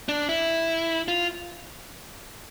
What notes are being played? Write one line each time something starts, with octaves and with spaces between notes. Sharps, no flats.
D4
E4
F4